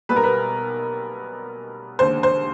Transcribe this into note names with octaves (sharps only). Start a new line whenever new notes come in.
B1 B2 G3 B3 B4
A#4
B4
E1 D#2 D3 C5
C5